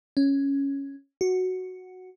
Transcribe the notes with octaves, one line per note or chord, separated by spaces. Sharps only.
C#4
F#4